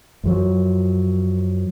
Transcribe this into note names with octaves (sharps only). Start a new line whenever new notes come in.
F#2 F3 F#3